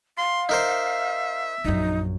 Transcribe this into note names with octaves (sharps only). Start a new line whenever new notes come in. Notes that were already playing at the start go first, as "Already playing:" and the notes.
F5 C6
D#4 A#4 C5 E5
A#1 F#2 D#4